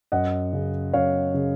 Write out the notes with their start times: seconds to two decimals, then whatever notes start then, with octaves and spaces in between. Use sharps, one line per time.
0.12 F#2 D#5 F#5
0.53 C#3
0.93 F#2 C#5 F5
1.34 C#3